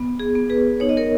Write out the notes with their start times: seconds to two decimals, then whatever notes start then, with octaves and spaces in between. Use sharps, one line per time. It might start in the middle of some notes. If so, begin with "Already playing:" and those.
Already playing: B3
0.19 G#4
0.35 B3
0.49 G#4 B4
0.80 D#4 C#5
0.89 D#5
0.97 A#4 C#5